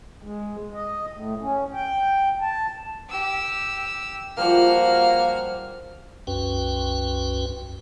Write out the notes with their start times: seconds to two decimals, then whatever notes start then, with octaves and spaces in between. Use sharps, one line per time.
0.23 G#3
0.74 D#5
1.13 A2
1.42 C#4
1.74 G5
2.41 A5
3.10 G4 E6
4.37 F3 G3 A#3 F#4 F6
6.27 C2 F#2 C#4 F#4 B4 G5